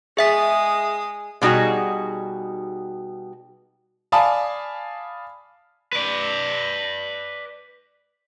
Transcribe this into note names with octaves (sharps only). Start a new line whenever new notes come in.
G#3 G#4 E5 D#6 B6
B2 G3 D#4 F#4 G#4
D5 F5 G#5 A5 B5 D#6
B4 D5